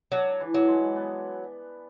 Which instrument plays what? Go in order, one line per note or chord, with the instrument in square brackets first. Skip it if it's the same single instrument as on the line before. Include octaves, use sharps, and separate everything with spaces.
[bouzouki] F#3 [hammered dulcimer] D4
[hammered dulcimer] E3
[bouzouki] F#3
[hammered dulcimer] G#3
B3